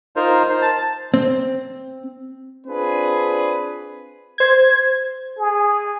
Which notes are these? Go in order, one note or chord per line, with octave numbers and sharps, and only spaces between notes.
D#4 F4 A#4 C5
C5
A5
C4
C4 D4 F4 G#4 B4
C5 G#6
G#4